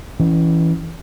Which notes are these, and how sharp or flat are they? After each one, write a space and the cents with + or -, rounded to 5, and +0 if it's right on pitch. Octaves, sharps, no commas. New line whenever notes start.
E3 +0 C#4 +10